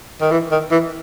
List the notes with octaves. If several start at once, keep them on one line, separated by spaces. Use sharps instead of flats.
D#3
E3
D#3
E3